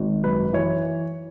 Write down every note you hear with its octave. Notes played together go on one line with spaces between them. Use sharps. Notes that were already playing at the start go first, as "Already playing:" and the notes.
Already playing: G#1
F#2 B4
E3 C#5